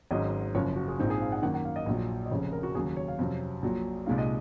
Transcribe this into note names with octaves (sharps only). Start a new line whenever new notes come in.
G#1 G#2 F#3 C#4 D#5
F#1 F#2 F3 C#5
F#4
G#4
A#1 G#2 F3 C4 D#4 C5
G#4
F5
F#5
F#2 D#3 A#3 F#5
F#5
F5
D#5
A#1 A#2 F#3
D#5
F1 F2 C#3 C#5
A#4
F#4
D#2 C#3 F#3 G#4
C#5
F5
F2 C3 F#3 C#4
A#1 A#2 F#3
C2 A#2 G#3 D#4 F5
D#5